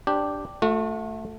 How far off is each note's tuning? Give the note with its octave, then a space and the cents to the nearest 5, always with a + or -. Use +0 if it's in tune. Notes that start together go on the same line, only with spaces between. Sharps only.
D4 +0 G4 +0 C5 +10
A3 +0 F#4 -40